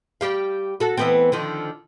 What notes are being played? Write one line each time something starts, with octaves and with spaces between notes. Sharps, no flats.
G3 G4 F5
F#4 A4
E3 B3 C4
D3 D#3 F3